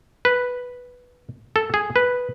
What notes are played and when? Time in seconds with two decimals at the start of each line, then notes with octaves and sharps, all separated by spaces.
0.25 B4
1.56 A4
1.74 G#4
1.96 B4